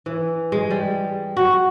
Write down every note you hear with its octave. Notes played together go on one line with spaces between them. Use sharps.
E3
G#3
G3
F#4